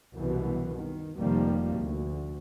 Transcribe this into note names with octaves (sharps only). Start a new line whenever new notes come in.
C2 F#2 B2 E3
D#3
F1 C3 D#3 F3 G3 A#3
D2